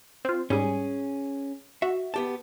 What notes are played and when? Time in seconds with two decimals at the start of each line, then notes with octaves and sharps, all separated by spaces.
0.25 C4 F4
0.50 G#2 G3 C#4 G#4
1.82 F#4 E5
2.14 B3 G4 A5